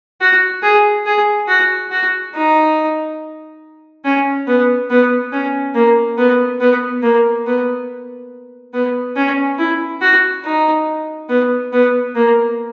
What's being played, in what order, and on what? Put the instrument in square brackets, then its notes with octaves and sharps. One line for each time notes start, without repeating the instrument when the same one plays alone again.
[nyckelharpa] F#4
G#4
G#4
F#4
F#4
D#4
C#4
B3
B3
C#4
A#3
B3
B3
A#3
B3
B3
C#4
E4
F#4
D#4
B3
B3
A#3